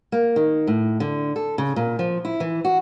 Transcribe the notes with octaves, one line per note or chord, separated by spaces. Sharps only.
A#3
D#3
A2
D3
A4
C#3
A#2
F3
E4
E3
F#4